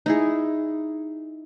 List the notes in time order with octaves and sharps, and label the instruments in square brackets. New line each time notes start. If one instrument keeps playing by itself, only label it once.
[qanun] D#4 E4 G#4